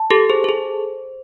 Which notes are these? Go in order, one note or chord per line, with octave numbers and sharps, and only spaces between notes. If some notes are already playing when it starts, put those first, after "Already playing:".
Already playing: A5
G4 A4
G#4 C5
A4
G#4